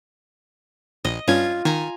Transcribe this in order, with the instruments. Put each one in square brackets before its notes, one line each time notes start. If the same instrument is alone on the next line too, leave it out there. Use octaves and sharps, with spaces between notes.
[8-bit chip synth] A#1 [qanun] D#5
[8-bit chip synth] G2 C#4 G#6 [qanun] F4
[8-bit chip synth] D#3 [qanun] G#5 A#5